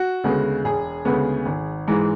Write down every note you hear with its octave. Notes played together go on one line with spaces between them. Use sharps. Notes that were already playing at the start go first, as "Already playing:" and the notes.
Already playing: F#4
D2 C#3 G#3 B3
E1 G#4
D2 C#3 G#3 B3
G#1
G#2 E3 G#3